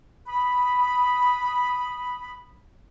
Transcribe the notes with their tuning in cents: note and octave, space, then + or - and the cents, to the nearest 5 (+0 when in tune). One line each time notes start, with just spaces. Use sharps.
B5 +0 D#6 +0